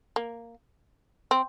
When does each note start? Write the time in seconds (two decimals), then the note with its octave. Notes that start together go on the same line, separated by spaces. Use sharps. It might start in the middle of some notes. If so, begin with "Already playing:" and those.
0.16 A#3
1.31 C4